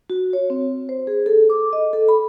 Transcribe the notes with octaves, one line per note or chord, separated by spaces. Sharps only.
F#4
C#5
C4
C5
G#4
A4
D6
D#5
A4
B5